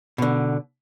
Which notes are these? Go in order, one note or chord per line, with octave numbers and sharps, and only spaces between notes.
B2 D3